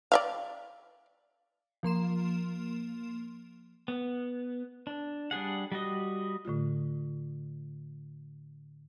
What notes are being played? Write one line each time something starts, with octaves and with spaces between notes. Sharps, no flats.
D5 E5 F5
F3 A#3 C6 E7
B3
D4
G3 D4 G#4 F#5
G3 F#4 D#5
A2 D3 A3 F4